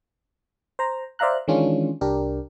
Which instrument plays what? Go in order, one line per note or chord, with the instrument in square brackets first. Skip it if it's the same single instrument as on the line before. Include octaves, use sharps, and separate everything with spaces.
[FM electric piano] C5 A#5
C5 D5 E5 F5 A#5 F#6
D#3 E3 G#3 C#4 D4 F4
C2 D4 G4 A#4